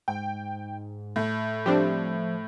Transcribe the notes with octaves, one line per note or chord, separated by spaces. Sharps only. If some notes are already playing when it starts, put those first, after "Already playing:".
G#2 G5
A2
F3 G3 C4 D4